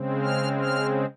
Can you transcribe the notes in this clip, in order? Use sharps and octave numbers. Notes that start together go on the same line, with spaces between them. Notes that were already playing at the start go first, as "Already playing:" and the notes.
Already playing: C#3 G#3 C4
F6
F6